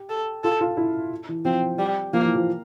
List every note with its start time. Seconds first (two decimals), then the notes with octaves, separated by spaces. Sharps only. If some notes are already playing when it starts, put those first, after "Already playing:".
Already playing: G4
0.10 A4
0.44 F4 A4
0.61 F4
0.77 E4
1.29 E3
1.45 F3 C4
1.79 G3
2.13 F3 A#3
2.25 E3
2.35 F3